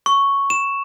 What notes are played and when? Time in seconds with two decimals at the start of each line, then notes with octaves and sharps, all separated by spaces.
0.06 C#6
0.50 E7